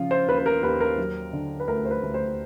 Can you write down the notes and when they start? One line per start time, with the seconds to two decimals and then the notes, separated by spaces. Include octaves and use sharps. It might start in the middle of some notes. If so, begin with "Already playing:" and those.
Already playing: C#3 F3 F4
0.11 C5
0.28 D#2 B4
0.38 B4
0.46 A#4
0.63 D#2 B4
0.81 A#4
0.98 F#3
1.33 D3
1.60 B4
1.68 D2 A#4
1.85 C5
1.91 B4
2.03 D2
2.14 C5